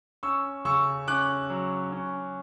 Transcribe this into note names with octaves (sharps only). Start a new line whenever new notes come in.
C#4 C#6 E6
C#3 C#6 E6
C#4 D6 F#6
F#3
C#4